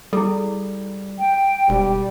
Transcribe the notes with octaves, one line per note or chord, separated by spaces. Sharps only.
G3 E4 G#4 A4
G5
E1 G3